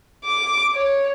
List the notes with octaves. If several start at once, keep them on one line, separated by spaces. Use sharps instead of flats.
D6
C#5